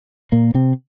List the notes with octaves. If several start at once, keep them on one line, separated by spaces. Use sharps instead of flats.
A#2 A#3
C3 C4